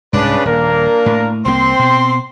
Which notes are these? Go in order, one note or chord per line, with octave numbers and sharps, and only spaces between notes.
C2 G#2 C#3 D4 B4
D#1 A#3 D4 A#4
A2
C2 F#3 A#3 C4 C6
B2